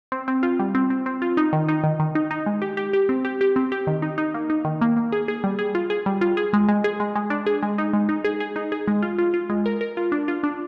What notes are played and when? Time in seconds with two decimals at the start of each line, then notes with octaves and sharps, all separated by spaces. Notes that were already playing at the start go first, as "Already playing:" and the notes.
0.12 C4
0.28 C4
0.43 F4
0.59 G3
0.75 C4
0.90 C4
1.06 C4
1.22 F4
1.37 D#4
1.53 D#3
1.69 D#4
1.84 D#3
2.00 D#3
2.15 D#4
2.31 D#4
2.46 G#3
2.62 G4
2.77 G4
2.93 G4
3.09 C4
3.25 G4
3.41 G4
3.56 C4
3.72 G4
3.87 D#3
4.02 D#4
4.18 D#4
4.34 A#3
4.50 D#4
4.65 D#3
4.81 A#3
4.97 A#3
5.12 G#4
5.28 G#4
5.44 G3
5.59 G#4
5.75 F4
5.90 G#4
6.06 G3
6.21 F4
6.37 G#4
6.53 G#3
6.69 G#3
6.84 G#4
7.00 G#3
7.16 G#3
7.30 D4
7.47 G#4
7.63 G#3
7.78 D#4
7.93 G#3
8.09 D#4
8.24 G#4
8.40 G#4
8.56 D#4
8.72 G#4
8.88 G#3
9.03 F4
9.18 F4
9.34 F4
9.50 G#3
9.66 A#4
9.81 A#4
9.97 F4
10.12 D4
10.28 F4
10.43 D4